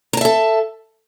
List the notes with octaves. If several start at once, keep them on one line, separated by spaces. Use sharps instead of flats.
A4 E5 A5 A#5